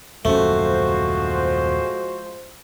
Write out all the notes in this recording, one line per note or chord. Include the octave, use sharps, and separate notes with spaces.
D#1 F#2 F3 G#3 A3 C#4 F#4 C5